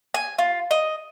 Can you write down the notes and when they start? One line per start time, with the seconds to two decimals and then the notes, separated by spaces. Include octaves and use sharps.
0.14 G#5
0.38 F4
0.71 D#5